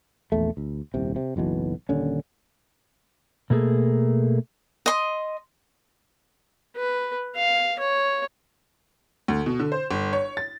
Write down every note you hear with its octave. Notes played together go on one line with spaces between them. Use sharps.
A#1 E2 A3
D2
D#1 C2 C3
C3
F#1 B1 B2 E3
D#1 D#2 D3 C#4
B2 A3 A#3 G#4 A4
D#5 C6
B4
F5
C#5
D2
B2
D3
C5
G1
C#5
A6